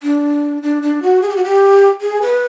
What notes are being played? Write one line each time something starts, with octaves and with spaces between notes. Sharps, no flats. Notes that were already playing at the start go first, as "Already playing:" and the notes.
D4
D4
D4
F#4
G#4
G4
F#4
G4
G#4
B4